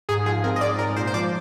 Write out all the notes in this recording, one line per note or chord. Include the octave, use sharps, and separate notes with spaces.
G#2 G#4
F3 G#4
C4 A#4
D#5
G#2 D5
G#2 A#4
A#2 C5
C5
F3 D5